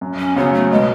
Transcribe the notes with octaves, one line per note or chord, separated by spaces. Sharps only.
F#2
C#4
C#3 F#3 B3
A3
B2 G#3